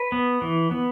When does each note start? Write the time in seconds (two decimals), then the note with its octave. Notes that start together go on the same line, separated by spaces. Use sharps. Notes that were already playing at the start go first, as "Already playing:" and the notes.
Already playing: B4
0.12 B3
0.42 E3
0.71 B3